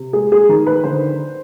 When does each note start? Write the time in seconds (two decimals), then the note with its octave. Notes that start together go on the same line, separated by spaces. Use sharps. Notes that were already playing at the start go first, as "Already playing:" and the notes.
Already playing: C3
0.13 G#3 G#4
0.32 G#4
0.49 D#3 A#4
0.67 B4
0.84 D3 C5